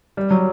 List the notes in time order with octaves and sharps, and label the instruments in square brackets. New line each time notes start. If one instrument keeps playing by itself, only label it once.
[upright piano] G3
F#3